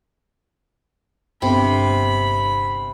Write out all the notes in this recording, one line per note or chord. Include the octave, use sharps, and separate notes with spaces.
G1 C3 B5